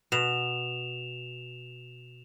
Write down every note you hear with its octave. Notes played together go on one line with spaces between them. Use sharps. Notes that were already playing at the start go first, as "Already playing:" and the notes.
B2 E7 F7